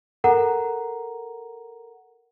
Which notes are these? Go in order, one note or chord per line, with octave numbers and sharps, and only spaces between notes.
A4 A#4 F#5 A#5